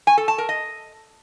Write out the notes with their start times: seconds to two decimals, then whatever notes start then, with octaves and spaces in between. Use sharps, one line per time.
0.07 G#5
0.18 A4
0.28 A5
0.38 A#4
0.49 D#5